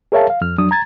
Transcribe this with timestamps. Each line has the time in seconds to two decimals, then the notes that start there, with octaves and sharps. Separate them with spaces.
0.12 G#4 A#4 C#5 E5 F5 A5
0.30 F5
0.41 F2 F6
0.58 F2 F#3 D4 D#6
0.71 A#5 G#6 A6